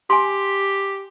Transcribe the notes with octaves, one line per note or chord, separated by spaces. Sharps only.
G4 G#5 C6